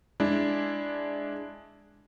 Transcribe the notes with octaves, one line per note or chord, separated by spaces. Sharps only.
G#3 D4 E4